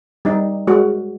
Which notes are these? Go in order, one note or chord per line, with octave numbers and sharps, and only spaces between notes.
G3 D#4
G#3 F#4